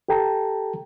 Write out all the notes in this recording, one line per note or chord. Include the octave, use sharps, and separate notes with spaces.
G4 A4 G5 A5 A#5